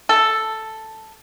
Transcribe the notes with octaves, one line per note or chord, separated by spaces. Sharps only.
A4